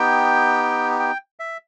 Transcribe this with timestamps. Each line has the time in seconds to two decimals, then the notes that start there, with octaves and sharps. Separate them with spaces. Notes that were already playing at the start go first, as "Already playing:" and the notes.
Already playing: B3 D#4 G4 G5
1.00 G5
1.40 E5